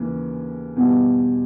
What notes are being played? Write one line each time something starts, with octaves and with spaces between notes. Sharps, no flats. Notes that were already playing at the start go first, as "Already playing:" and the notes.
Already playing: D#2 C#3 E3
E2 B2 G3